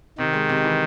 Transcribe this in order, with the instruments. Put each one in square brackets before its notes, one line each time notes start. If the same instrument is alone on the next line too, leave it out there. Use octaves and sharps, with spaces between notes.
[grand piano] C3 [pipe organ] D#3
[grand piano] G#3
C3
E3